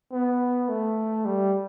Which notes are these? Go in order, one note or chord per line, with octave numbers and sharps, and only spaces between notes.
B3
A3
G3